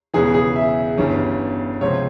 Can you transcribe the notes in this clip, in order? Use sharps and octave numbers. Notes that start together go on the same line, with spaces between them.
E1 E2 C#3 E3 G#4
G#4
E5
G1 G2 E3 G3 C#4
C#2 C3 F3 C4 C#5